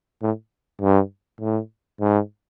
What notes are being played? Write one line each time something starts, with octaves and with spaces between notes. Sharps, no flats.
A2
G2
A2
G#2